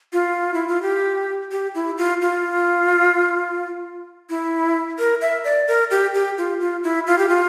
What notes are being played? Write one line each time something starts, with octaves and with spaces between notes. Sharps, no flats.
F4
E4
F4
G4
G4
E4
F4
F4
E4
A#4
E5
D5
A#4
G4
G4
F4
F4
E4
F4
G4
F4